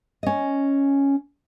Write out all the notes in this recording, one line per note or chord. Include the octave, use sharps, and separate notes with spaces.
C#4 D#5